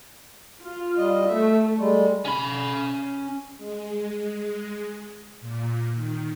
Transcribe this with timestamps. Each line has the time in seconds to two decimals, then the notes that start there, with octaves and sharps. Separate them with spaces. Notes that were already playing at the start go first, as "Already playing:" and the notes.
0.61 F4
0.97 G3 D#5
1.27 A3 E5
1.78 G3 G#3
2.25 C#4 B5
3.56 G#3
5.41 A#2
5.95 D#3